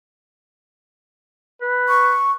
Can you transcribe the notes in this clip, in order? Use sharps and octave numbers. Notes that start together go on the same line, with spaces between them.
B4
C#6